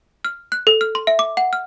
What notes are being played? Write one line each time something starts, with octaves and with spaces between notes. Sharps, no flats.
F6
F#6
A4
F6
C6
E5
D6
F#5
F6